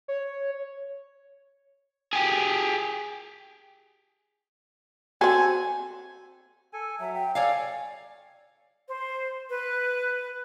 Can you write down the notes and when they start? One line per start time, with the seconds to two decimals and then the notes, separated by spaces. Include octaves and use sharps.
0.08 C#5
2.13 G4 G#4
5.21 C4 F#4 A4 G#5
6.73 A4 G#5
7.00 F#3 E5
7.15 G5
7.35 A4 C#5 D5 F5 G#5
8.88 C5
9.50 B4